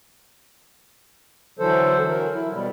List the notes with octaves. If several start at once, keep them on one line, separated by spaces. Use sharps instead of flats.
D3 E3 F#3 A4 C5
F#3 A#4
E4
B2 G3